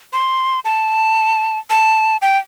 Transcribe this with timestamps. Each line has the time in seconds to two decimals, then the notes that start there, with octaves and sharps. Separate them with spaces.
0.13 C6
0.65 A5
1.70 A5
2.22 G5